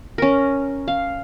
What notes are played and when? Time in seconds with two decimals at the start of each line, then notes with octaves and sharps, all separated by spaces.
0.18 C#4 A#4
0.88 F5